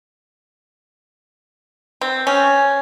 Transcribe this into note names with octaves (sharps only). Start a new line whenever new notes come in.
C4
C#4